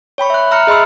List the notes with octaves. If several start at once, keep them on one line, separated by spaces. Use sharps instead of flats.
C#5 G5 B5 C#6
E5 F#6
E5 A#5 F6 F#6 C#7
G#4 D#5 B5 C6 E6